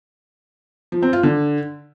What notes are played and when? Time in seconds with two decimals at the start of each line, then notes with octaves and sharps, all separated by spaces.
0.92 F3
1.02 C4
1.13 F4
1.23 D3